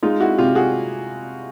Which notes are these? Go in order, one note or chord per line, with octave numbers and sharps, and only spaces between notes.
G#3 D#4 F4
E4 F#4
C3 F4 G4
F#4 G#4